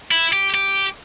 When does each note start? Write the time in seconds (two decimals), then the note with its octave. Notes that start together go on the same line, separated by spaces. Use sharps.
0.11 E4
0.33 G4
0.54 G4